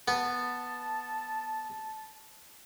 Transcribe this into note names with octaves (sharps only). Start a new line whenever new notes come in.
B3 A5